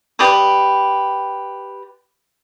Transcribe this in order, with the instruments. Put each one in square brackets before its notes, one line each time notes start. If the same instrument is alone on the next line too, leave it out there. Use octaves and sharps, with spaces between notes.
[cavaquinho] G4 B4 D5 D#6